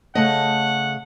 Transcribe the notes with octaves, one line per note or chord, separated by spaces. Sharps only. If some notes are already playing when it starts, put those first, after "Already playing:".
C#3 A3 D#5 F#5